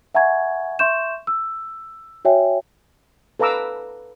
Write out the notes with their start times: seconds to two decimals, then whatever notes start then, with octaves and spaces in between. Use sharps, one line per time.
0.15 E5 F#5 G#5 A#5 C#6 G#6
0.79 E5 C6 C#6 G6 E7
1.27 E6
2.25 F#4 C#5 E5 G5 G#5
3.40 A4 B4 F5 A#5 D6 E6